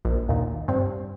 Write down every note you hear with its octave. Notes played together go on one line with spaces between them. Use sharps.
A#1
D#2 A#2
G2 C4